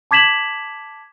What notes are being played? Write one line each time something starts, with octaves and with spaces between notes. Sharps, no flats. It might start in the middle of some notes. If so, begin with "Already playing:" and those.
A5 D6 G#6 B6 E7 F#7